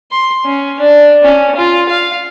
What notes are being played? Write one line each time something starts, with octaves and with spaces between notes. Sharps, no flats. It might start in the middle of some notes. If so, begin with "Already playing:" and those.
C6
C#4
D4
C#4
F4
F5